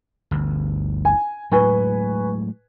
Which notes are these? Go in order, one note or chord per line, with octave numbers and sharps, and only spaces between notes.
G1 D2
G#5
A2 F#3 G#3 B4 G#5 C#6